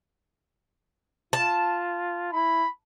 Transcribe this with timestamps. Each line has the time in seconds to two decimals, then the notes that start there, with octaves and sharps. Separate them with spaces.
1.33 F4 A5
2.33 E4 B5